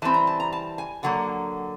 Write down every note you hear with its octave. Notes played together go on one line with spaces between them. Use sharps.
E3 G3 C4 A5
A#5
A5
A#5
A5
G#5
D3 F#3 A#3 F#5